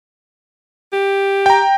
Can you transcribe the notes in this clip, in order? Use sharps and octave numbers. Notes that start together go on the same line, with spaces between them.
G4
G5 A#5